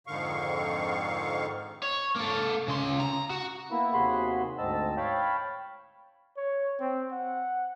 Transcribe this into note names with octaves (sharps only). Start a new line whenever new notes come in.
F2 G#2 D3 D#3 F5 C#6
C#5
A#3 A4
C#3 C6
A#5
F#4
A#3 B3 E4
D#2 C3 F#4 G#4 B5 C6
D2 G#2 C4 D#5 A5 E6
C#5 F5 G5 A5 B5
C#5
C4
F#5